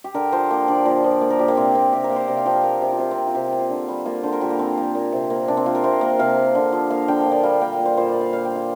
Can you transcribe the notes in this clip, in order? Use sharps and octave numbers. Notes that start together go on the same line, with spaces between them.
G4
D3 A#4
F3 C5
A#3 G4
D3 D5
A#2
F3
A#3 D5
A#4
A#2 G4
A#3
C3 C4
A#3 C4
C3 G4
A#4
A#3
C5
C3 D5
F5
F3 G5
F5
A#3 A#4
C3
F4
C3 G4
C4
A#3
F4
C3 G4
F4
A#3
F4
D3
G3
A#3 F4
D3 C5
A#4
A#2 G4
A#3
F3 C4
A#3
A#2
C3
A#3
C3 D4
C4
A#3 F4
A#4
C3 C5
A#3
C3 F5
A#3
D3
F3
A#3 F5
D3 G5
F5
A#2
D5
G3 F5
A#3 G5
F5
A#2
C5
A#2 C5
D5
A#3
F5
A#2 F5
G5
A#3
F5